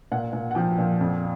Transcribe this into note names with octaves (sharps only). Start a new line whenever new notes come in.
A#2 F#5
A#2
F#5
F3 G5
A#2
F2